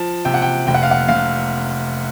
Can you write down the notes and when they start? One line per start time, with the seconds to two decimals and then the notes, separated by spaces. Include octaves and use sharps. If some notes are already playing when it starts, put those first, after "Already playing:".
Already playing: F3 A5
0.25 C3 G5
0.34 F#5
0.42 G5
0.67 F1 G5
0.74 F#5
0.83 F5
0.91 F#5
1.08 F1 F5